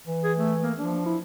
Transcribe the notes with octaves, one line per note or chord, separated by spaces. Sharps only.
E3
G#4
A3
A#3
F3 D4
E4